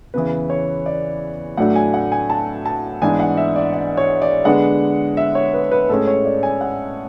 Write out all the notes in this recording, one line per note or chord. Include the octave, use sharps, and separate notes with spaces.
E2 C#3 E3 B4
C#5
D5
A2 F#3 A3 D4 F#5
G#5
F#5
G#5
A5
A5
G#2 E3 B3 D4 G#5
F#5
E5
D5
D5
C#5
D5
D3 G#3 B3 D4 F#5
E5
C#5
B4
B4
A2 G#3 C#4 A4
C#5
D5
G#5
F#5